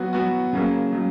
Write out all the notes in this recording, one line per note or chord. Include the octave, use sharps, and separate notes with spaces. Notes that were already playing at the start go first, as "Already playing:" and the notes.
Already playing: F#3 B3 F#4
F#3 B3 F#4
C#3 F#3 A#3
C#3 F#3